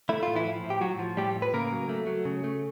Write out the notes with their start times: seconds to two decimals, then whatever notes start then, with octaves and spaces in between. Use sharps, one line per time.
0.09 A3 E4
0.23 A2 F4
0.35 E3 E4
0.45 F3
0.64 A2
0.70 G4
0.81 A2 F#3 F#4
0.99 F3
1.17 A2 G3 G4
1.36 A2
1.42 B4
1.54 C#3 A#3 A#4
1.72 F#3
1.89 A3
2.07 F#3
2.25 C#3
2.44 A3